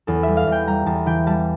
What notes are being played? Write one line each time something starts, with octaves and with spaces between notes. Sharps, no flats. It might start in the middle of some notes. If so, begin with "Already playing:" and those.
E2 A4
G3 E5
F5
E2
G5
G3 A#5
E2 A5
E3 G5
G3 A5